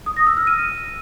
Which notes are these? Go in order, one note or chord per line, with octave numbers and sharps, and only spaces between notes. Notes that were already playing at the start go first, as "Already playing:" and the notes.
D#6
A#6
E6
F6
D#7